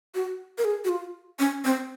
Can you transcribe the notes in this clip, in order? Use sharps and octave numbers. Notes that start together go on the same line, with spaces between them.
F#4
A#4
G#4
F#4
F4
C#4
C4